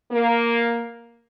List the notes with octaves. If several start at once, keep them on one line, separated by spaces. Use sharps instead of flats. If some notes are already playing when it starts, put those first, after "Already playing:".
A#3